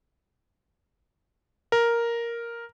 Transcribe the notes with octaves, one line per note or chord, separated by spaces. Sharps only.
A#4